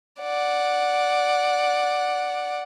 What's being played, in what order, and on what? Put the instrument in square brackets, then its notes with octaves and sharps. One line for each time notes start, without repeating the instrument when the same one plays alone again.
[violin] D5 F#5